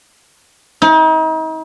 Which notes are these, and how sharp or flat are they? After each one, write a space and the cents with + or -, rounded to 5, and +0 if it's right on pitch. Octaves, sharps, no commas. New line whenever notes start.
D#4 +40